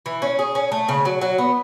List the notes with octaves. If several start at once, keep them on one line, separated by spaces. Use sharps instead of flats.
E3
C#4
G#4
C#4
A3
C#3
F#3
F#3
B3